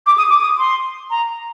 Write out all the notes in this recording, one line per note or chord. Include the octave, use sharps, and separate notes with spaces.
D6
D#6
D6
D#6
C6
A#5